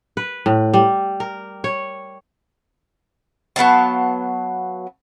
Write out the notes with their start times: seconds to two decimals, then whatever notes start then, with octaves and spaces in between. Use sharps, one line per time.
0.17 B4
0.46 A2
0.74 G3
1.20 A#4
1.64 C#5
3.56 F#3 B3 F5 A5